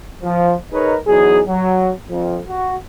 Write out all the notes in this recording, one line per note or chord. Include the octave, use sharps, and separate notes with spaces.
F3
D#4 G#4 A#4 B4 C#5 D#5
E2 F#3 D#4 G#4
F#3
F2
F#4